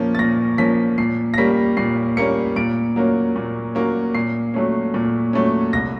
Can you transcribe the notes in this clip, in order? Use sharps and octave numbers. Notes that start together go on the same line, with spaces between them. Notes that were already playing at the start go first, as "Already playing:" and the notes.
Already playing: A#2 F3 A#3 C#4
A6
A#2 A#6
F3 A#3 C#4 B6
A#2 C7
A#6
G3 A#3 C#4 B6
A#2 C7
G3 A#3 C#4 C#7
A#2 D7
F#3 A#3 C#4
A#2
F#3 A#3 C#4
A#2 C7
F#3 A3 C#4
A#2
F#3 A3 C#4
C2 A#6